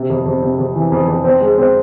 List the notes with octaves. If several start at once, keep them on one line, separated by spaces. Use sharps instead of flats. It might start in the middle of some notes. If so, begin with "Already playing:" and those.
Already playing: C3
F2
F2
C3
F2
E3
F2
F2
C4
G#3
C4